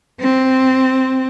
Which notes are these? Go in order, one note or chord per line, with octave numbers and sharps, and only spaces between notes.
C4